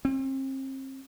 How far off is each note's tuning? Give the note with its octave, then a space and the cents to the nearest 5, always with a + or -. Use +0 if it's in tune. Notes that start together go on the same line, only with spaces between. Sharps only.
C4 +35